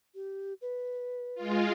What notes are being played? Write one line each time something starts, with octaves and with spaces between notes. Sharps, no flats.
G4
B4
G#3 F4